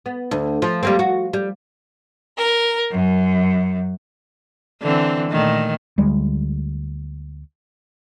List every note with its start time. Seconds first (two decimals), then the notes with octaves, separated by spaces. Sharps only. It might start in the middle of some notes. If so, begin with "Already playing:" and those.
0.06 B3
0.31 D2
0.62 F3
0.83 G3 A#3 C4
0.99 F#4
1.33 G3
2.37 A#4
2.91 F#2
4.82 D3 E3 C4
5.31 A#2 D#3 A3
5.98 D2 G3 G#3